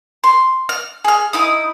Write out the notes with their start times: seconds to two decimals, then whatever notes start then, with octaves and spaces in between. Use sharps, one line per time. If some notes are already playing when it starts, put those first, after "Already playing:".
0.24 C6
0.69 F6
1.04 G#4 F6
1.33 D#4 E4 D#6